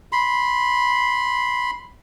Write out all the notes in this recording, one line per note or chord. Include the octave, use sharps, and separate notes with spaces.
B5 C6